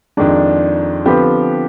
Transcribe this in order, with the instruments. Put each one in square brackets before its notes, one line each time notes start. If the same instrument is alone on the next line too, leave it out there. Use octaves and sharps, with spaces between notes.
[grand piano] F2 D#3 G#3 [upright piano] D4 D5
[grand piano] D3 F3 C4 G4 [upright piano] B3 B4